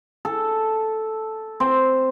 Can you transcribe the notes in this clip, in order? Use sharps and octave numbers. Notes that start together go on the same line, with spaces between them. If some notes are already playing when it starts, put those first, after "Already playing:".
A4
C4